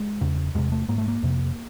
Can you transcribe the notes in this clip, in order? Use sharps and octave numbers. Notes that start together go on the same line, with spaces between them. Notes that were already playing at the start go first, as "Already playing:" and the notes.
Already playing: G#3
E2 C#3
E2 C3 G#3
A3
G#2 A#3
A3
A#3
F2 C3